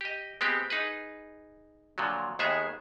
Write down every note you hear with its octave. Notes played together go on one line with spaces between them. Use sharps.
G4 D#5
G#3 B3 C4 G4
D#4 G#4 B4
A#2 D3 F3 F#3
D#2 D#3 G#3 B3 G#4 E5